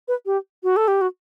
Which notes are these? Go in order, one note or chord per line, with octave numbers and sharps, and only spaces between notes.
B4
G4
F#4
A4
G4
F#4